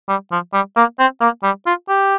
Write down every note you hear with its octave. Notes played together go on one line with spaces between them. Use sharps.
G3
F3
G3
A#3
C4
A#3
G3
F4
G4